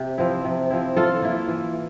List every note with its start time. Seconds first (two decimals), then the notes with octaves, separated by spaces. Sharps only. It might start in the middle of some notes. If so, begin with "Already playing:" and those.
Already playing: C3 G4
0.18 F3 C4 E4
0.45 C3
0.70 F3 C4 E4
0.96 E3 F4 A4
1.22 A#3 E4
1.48 E3